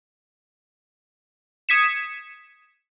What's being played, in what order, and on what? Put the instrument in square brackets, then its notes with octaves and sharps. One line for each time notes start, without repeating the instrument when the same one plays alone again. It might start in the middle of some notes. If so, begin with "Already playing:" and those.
[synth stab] D#6 G#6 B6 C#7 E7